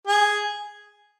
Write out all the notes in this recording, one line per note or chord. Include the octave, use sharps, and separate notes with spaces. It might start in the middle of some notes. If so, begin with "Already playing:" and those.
G#4